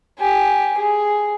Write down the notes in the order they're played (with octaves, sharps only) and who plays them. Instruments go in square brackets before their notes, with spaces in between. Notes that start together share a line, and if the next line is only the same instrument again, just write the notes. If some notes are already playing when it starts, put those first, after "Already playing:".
[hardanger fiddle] G4 G#5
G#4